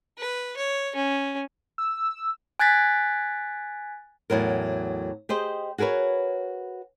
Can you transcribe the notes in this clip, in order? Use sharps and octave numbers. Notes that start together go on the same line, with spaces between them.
B4
C#5
C#4
E6
G#5 F#6 G#6 A6 B6
E2 A2 F#3 A#4
G4 G#4 C5 D#5
F#4 G#4 A#4 B4 C#5